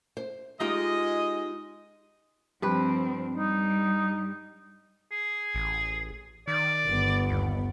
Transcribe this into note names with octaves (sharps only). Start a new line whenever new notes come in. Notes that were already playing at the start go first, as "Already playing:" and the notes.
C5
G#3 D#4 F4 G4 D#5
G2 F3 C4 B4
G3 D#4
G#4
A1
D#3 D5
G1 B3
D#2